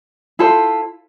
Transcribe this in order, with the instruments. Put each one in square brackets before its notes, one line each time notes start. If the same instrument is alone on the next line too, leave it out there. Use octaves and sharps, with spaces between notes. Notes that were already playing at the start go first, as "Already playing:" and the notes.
[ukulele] E4 F4 A4 C5